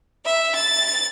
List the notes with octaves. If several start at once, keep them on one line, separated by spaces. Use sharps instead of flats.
E5
A6